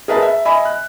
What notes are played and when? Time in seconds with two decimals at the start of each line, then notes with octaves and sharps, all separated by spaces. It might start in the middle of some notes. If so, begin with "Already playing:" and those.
0.08 G#4 A#4 B4 D#5 E5 A5
0.22 E5
0.45 D#5 E5 G#5 B5
0.65 F#6